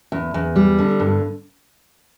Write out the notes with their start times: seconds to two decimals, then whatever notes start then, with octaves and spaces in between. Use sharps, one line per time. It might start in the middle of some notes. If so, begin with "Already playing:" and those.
0.12 E2
0.34 E2
0.56 G3
0.79 D3
1.00 G2